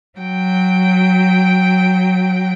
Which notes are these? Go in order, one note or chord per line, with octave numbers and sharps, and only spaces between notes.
F#3 G5